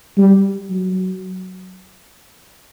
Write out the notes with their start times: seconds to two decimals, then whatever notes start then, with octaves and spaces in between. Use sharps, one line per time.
0.17 G3
0.70 F#3